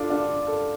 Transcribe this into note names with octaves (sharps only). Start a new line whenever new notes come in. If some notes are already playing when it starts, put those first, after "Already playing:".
Already playing: D4 F4 A4
D4
A4